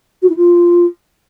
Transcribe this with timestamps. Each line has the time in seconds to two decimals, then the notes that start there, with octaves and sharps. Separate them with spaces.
0.22 F#4
0.29 E4
0.36 F4